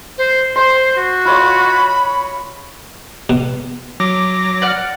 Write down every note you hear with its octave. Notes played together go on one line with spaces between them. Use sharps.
C5
C5 C6
F#4
F4 C#5 D#5 B5
B2
F#3 D6 A#6
D5 F#5 F6